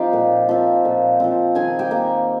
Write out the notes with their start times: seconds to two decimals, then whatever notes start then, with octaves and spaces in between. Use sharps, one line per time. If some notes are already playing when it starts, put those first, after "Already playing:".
Already playing: F3 C4 D#4 F4 G4 D#5 F5 G5
0.13 A#2
0.49 F3 C4
0.85 A#2
1.20 F3 C4
1.55 D#3 G#4 G#5
1.79 G4 G5
1.91 A#3